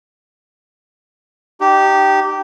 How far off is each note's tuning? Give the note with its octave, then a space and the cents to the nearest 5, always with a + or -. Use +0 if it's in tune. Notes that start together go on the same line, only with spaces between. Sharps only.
D#4 -35 G4 -15